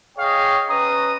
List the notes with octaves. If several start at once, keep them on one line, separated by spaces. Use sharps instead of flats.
G#4 C#5 D#5 F5 G5
C#4 B4 D#5 A#5 D#6